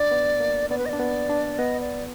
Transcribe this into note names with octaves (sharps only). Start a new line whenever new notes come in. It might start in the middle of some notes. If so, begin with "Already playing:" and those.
Already playing: D4 D5
B3
A#3
B3 D5
B4
D#5
D4 D5
B3
D4
B3 D#5
D5